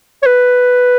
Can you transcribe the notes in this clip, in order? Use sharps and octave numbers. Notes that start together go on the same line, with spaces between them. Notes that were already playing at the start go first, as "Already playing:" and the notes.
C#5
B4